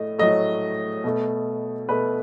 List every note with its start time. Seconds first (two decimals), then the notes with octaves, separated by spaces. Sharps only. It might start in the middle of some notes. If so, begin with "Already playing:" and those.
Already playing: A2 A3 D#5
0.19 A2 F#3 A3 D#5
1.04 B2 A3
1.89 B2 A3 B4